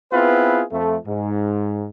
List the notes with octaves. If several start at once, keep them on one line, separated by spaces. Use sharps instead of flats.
B3 C4 E4 F4 G#4 B4
F2 A3
G#2